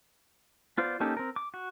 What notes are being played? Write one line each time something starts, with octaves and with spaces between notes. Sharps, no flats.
B3 F4 C5 D5
A#3 C#4 D#4 G4 A4
C4 A#4
D6
F#4